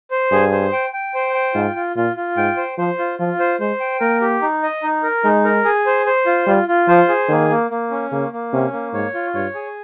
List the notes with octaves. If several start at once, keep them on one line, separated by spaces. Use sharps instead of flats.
C5
G2 G#4
C5
G5
G5
C5
G5
G#2 F4
F4
A#2 F4
F4
G#2 G5
C5
F3 C5
F4
F3 F4
C5
G#3 C5
G5
A#3 A#4
G4
D#4
D#5
D#4
A#4
G#3 D#4
A#4
G#4
C5
C5
F4
G3 F4
F4
F3 C5
G#4
D#3 A#3
A#3
A#3
C#4
C#3 A#3
A#3
C3 C#4
A#3
G#2 C#5
F4
G2 C#5
G#4